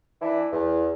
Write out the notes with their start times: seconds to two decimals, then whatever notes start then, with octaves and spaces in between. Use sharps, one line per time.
0.22 E3 D4 E4
0.52 E2